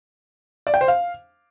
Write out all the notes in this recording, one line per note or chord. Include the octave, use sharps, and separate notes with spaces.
D5
G5
C5
F5